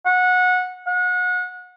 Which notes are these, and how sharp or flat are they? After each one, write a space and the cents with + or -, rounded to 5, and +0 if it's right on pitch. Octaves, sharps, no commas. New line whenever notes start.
F#5 -20
F#5 -30